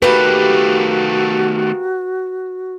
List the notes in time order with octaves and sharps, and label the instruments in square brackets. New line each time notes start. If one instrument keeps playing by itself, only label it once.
[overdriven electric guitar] D#3 A3 [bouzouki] A#3 G4 [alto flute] F#4 [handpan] B4